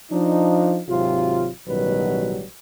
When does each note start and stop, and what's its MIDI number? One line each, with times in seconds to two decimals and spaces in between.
0.10 0.79 53
0.10 0.79 62
0.10 0.79 63
0.88 1.48 32
0.88 1.48 48
0.88 1.48 54
0.88 1.48 65
1.67 2.45 33
1.67 2.45 47
1.67 2.45 51
1.67 2.45 54
1.67 2.45 55
1.67 2.45 71